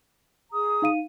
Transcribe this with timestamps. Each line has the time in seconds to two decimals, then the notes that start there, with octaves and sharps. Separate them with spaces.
0.52 G#4 A#5 D#6
0.82 D#4 F5 D#7